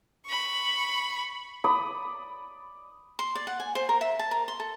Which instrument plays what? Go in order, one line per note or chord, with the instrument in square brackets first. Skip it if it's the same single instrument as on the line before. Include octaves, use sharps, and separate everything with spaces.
[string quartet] B5 C#6
[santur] D5 B5 D#6
[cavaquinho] C6
D5
F#5
G#5
C5
A#4
E5
A5
A#4
C6
A4